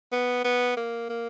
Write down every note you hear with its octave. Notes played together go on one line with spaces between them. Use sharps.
B3
B3
A#3
A#3